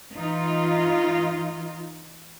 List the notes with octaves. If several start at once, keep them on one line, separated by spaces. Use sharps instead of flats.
E3 D#4 F4